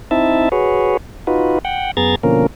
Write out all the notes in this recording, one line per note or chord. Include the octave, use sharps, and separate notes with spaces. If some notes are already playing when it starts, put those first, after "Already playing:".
C4 D#4 E4 E5 A5
F#4 G#4 B4 C#5
D#4 F4 F#4 B4
F#5 G5
F#2 B3 G#4 A#5 G#6 A6
B2 D3 F3 A#3 C#4 A#4